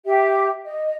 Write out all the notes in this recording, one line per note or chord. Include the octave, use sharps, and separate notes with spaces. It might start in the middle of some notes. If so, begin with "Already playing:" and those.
G4 E5
D#5